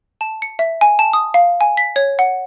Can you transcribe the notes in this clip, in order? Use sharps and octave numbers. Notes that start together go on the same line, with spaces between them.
A5
C#7
E5
G#5
A5
D#6
F5
G#5
B6
C#5
F#5